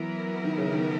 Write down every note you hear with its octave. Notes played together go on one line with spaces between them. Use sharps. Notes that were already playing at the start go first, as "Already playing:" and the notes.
Already playing: E3 F#3 B3 E4 A#4
D#3
C#3
D#3